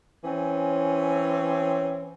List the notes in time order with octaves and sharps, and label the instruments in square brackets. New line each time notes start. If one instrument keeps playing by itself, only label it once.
[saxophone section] E3 C4 C#4